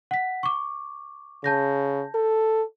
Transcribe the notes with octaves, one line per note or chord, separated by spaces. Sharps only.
F#5 B6
C#6 D6
C#3 A5 G6 A#6
A4